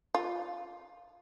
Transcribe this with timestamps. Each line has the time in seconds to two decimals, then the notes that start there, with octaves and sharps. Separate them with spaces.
0.15 F4